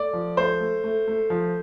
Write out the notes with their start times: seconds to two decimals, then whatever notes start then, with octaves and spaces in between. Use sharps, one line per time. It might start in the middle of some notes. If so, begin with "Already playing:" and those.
Already playing: A3 D5
0.13 F3
0.37 A3 C5
0.60 A3
0.84 A3
1.08 A3
1.30 F3